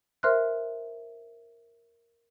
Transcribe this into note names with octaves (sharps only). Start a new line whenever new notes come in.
A#4 C5 E5 C6 F6 F#6